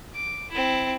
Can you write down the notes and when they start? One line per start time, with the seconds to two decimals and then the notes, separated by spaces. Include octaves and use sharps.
0.16 D6
0.51 C4 E4